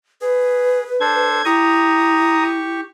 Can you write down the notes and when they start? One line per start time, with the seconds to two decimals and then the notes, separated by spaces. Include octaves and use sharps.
0.21 G#4 B4
1.00 D4 A4 C5 G#6
1.45 E4 G4 A#5 C#6 D#6